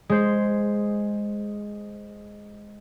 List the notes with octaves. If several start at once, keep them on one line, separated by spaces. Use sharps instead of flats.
G#3 C5